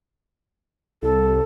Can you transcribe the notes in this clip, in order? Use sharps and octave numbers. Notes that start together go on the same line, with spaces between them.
C2 A4